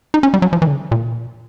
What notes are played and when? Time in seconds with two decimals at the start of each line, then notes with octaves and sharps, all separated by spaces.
0.14 D#4
0.23 C#4
0.34 G3
0.42 F#3
0.53 F3
0.62 E3
0.67 D3
0.72 C#3
0.91 A#2